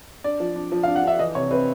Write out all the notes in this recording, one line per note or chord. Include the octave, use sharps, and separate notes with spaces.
D4 D5
F3
D4
F3
F5
D4
F#5
D4 E5
E3 D#5
C3 C#5
C4 B4